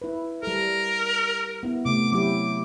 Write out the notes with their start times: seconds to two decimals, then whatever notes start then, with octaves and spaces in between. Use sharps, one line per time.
0.02 E4 B4
0.43 G3 A4 A#4
1.63 B3 E4
1.85 C3 A3 D6
2.12 F#3 E4 G4 D6